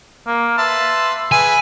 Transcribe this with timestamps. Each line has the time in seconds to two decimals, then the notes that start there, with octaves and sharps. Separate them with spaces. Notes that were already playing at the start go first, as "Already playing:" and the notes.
0.26 A#3
0.58 B4 E5 A5 C6
1.32 G#4 B4 E5 G#5